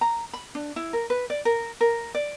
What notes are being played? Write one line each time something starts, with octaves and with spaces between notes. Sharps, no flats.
A#5
B5
D4
E4
A#4
B4
D5
A#4
A#4
D5